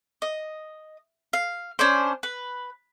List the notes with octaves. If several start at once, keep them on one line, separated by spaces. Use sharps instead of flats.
D#5
F5
C#4 D4 C5
B4